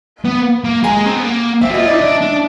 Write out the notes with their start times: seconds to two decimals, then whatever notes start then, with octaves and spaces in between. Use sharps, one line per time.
0.25 B3
0.64 A#3
0.83 G#3 G#5 A#5
1.06 C4
1.15 B3
1.23 A#3
1.61 C4 E5
1.70 F#4
1.74 F4 D#5
1.85 E4 D5 E5
1.93 D#4
2.01 D4
2.21 D4